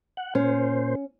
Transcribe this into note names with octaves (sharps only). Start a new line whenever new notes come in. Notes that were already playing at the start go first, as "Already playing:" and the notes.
F#5
A#2 C#4 C5